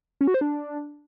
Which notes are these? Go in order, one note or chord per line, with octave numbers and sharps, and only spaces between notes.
C#4
F#4
C5
D4